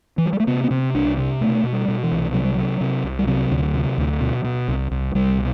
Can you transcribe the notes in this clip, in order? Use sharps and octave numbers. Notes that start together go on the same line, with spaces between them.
E3
F#3
G3
A3
C3 B3
B3
C3 C4
C2 D4
C3
B2 A3
B2
G3
B2
E3
C2
C3 F#3
G3
C3 F#3
C3
C2
G3
C3 F#3
D2
C3
D2
B2
B2
C2
C2
C2 G3
B2